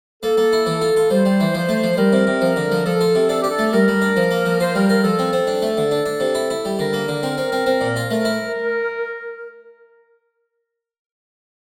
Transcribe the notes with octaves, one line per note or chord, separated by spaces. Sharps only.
A#3 A4
A#3
E4
E3
F4
F4
G3 C5
G3
E3
F3
A3
F3
G3 A#4
C3
C3
F3
D3
F3
F3 A4
F4
C3
D4 A4
D4 G4
A4
A3
G3 A#4
G3
D4
F3
A#3
F3
F4 C5
G3 A#4
F4 A#4
F3 A4
C4
C4
D4
A3
D3
D4
D4
C3
E4
E4
G3
D3 A#4
A#3
D3
C4
C4
C4
C4
A#2
F4
A3 A#4
E4